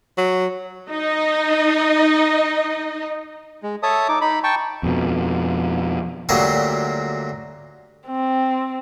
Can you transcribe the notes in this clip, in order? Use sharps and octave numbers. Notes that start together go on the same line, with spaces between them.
F#3
D#4 D#5
G#3
A4 C#5 E5 A5 D#6
D#4 D6
D#4 B5
G5 A5 C#6
F2 B2
D2 A#2 F#3 G3 C#5 F5
C4